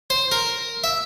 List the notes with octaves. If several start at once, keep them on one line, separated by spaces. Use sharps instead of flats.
C5
A#4
E5